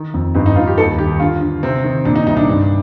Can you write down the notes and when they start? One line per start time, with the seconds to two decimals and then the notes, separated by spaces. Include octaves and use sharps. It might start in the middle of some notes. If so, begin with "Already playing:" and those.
Already playing: D#3
0.14 F2
0.35 G2 D#4
0.46 D#4
0.56 G2 F4
0.67 G4
0.78 D#2 A4
0.98 D#3 G4
1.20 D3 F4
1.41 D3
1.63 C3 C4
1.84 D#3
2.05 A#2 D4
2.16 D#4
2.27 C2 D#4
2.37 D4
2.48 G2